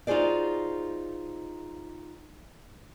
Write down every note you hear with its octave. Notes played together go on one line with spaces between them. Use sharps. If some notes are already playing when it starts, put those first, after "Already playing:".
D#4 F4 F#4 G#4 C5 D5